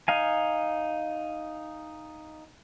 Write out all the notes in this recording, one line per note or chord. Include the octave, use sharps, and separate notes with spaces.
D#4 F5 G#5